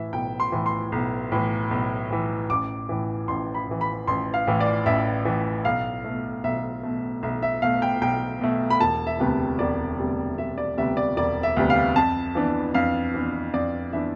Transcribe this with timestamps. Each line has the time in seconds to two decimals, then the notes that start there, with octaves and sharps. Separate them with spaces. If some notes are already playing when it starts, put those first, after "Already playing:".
Already playing: A2 E3 E5
0.13 B1 G5
0.40 C6
0.52 A2 E3
0.66 C6
0.92 B1
1.32 A2 E3
1.71 B1
2.10 A2 E3
2.50 A1 D6
2.89 A2 E3
3.28 A1 C6
3.54 B5
3.68 A2 E3
3.81 B5
4.07 A1 C6
4.34 F5
4.47 A2 E3
4.61 D5
4.86 A1 E5
5.25 A2 E3
5.65 B1 F5
6.04 B2 A3
6.44 B1 E5
6.83 B2 A3
7.23 B1 E5
7.43 E5
7.62 B2 A3 F5
7.82 G5
8.01 B1 G5
8.41 B2 A3
8.70 B5
8.81 E1 A5
9.07 E5
9.20 D2 C3 G3 B3
9.59 E1 D5
9.98 D2 C3 G3 B3
10.38 E1 E5
10.58 D5
10.78 D2 C3 G3 B3 E5
10.97 D5
11.17 E1 D5
11.43 E5
11.56 D2 C3 G3 B3
11.70 F5
11.95 F2 A5
12.35 E3 B3 D4
12.74 F2 F5
13.14 E3 B3 D4
13.54 F2 D5
13.93 E3 B3 D4 E5